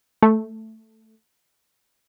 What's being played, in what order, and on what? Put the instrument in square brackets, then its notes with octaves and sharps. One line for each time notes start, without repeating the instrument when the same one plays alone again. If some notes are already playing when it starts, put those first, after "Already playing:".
[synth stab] A3